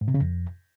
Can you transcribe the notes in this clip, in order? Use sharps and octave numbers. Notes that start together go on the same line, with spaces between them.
G#2
C3
C#3
F2